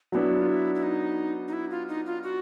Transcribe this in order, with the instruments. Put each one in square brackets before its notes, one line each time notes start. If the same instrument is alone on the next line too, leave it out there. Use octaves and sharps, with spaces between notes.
[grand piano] F#3 B3 D4 [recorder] E4
[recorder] F4
E4
E4
D#4
D#4
E4
F4
D#4
F4
F#4